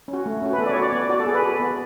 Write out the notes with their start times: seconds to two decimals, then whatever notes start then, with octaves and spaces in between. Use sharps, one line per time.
0.08 C#4
0.13 F#4
0.26 A3
0.42 C#4 F#4
0.53 B4
0.58 B3 A4
0.66 D5
0.70 C#5
0.76 F#4
0.82 D5
0.92 B3 D5
1.10 F#4 D5
1.19 A4
1.26 B3 G#4
1.35 B4
1.42 F#4 A4
1.60 B3